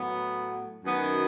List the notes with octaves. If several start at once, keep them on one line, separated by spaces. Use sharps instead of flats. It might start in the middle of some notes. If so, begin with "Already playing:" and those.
Already playing: A2 F#3 B3
F#2 D#3 F#3 B3